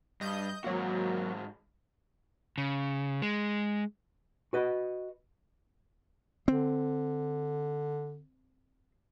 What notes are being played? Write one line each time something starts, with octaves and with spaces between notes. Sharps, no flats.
G2 D#5 G6
G#2 F#3 A#3 F#4
C#3
G#3
F#4 B4 D#5
D3 C4